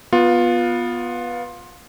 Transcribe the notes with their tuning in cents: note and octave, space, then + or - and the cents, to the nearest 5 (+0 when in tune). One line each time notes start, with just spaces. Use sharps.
B3 -10 F4 +15